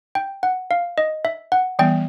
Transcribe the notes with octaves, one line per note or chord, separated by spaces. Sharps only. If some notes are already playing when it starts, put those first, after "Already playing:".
G5
F#5
F5
D#5
E5
F#5
E3 G3 B3 G5